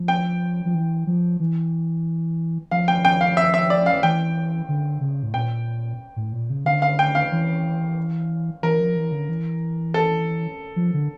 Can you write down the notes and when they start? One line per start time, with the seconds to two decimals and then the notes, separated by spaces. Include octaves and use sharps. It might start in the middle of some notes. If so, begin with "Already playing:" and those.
Already playing: F3
0.08 G5
0.65 F3
0.75 E3
1.07 F3
1.40 E3
2.71 F3 F5
2.88 G5
3.05 G5
3.21 F5
3.37 E5
3.54 E5
3.70 D5
3.86 F5
4.03 E3 G5
4.69 D3
5.01 C#3
5.23 A2
5.34 A#2 G5
6.16 A2
6.32 A#2
6.50 C#3
6.65 D3 F5
6.82 F5
6.99 G5
7.15 F5
7.32 E3
8.63 E3 A#4
8.79 F3
8.96 E3
9.12 D3
9.29 E3
9.94 A4
10.76 F3
10.94 D3